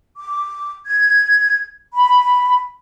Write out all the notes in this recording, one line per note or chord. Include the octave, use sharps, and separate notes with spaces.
D6
G#6
B5